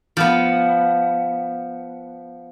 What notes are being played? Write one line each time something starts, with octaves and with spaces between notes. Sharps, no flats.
F3 B3